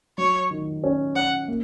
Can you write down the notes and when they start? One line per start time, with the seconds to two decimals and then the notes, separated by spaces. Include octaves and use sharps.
0.18 F#3 C#5
0.51 D#3
0.84 C#4
1.16 C#4 F#5
1.48 A#3